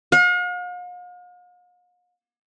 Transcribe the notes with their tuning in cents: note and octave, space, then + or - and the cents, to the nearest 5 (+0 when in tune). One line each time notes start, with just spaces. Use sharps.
F5 +45